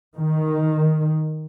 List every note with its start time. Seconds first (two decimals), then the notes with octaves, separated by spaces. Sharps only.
0.16 D#3